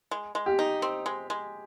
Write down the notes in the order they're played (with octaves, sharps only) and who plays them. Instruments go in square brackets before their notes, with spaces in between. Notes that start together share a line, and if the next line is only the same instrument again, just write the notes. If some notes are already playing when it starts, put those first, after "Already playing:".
[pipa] G#3
G#3
[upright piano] G4
[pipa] D#4
C4
G#3
G#3